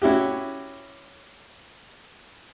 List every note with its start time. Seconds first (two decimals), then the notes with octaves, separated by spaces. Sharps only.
0.02 C#4 E4 F#4 G4